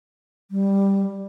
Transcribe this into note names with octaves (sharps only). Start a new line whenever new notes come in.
G3